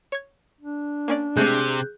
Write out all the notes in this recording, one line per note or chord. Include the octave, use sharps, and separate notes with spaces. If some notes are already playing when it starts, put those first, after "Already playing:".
C#5 G#6
D4
A#3 C#4 D5
C3 G#3 A3 C4 G#4 F#6 G6